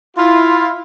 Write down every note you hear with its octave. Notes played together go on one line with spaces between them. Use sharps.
E4 F4